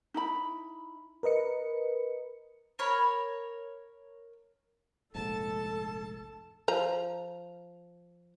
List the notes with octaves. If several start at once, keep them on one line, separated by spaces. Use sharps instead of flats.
D#4 E4 B5
A#4 B4 D#5 C#7
A#4 C#5 B5
F1 A#1 G#2 A4 A5
F3 A#5